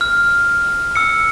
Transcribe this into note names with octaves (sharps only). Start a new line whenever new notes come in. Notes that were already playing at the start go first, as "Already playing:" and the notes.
F6
E6 C#7